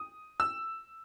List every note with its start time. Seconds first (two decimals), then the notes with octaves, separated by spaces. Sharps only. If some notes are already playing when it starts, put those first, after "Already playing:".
Already playing: D#6
0.40 E6